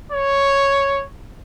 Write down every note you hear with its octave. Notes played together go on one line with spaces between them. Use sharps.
C#5